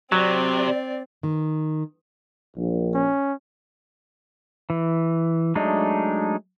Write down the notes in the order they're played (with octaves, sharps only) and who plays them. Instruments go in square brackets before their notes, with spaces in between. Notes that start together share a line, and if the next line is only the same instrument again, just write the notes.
[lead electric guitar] C3 [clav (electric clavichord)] F#3 [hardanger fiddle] C4 [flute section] D5
[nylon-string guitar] D#3
[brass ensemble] A#1
[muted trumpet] C#4
[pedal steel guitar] E3
F#3 G#3 A3 D4 D#4